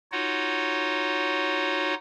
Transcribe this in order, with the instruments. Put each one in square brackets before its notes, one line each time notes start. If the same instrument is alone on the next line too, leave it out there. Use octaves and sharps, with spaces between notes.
[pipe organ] D#4 F4 F#4 C#5 F#5